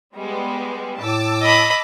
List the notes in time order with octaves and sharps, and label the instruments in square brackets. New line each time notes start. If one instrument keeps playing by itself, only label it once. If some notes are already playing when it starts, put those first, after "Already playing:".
[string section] G3 G#3 B3
[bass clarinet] A2 [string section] A5 D6 E6
[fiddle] D#5 B5